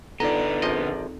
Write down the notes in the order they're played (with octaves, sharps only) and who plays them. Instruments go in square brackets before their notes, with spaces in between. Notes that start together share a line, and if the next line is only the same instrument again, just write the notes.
[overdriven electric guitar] D3 B3 [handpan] D#4 F4 A4 [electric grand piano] D5 A#5 [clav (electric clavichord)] D#5
[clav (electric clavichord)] A#1 F3 D#5 [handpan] C4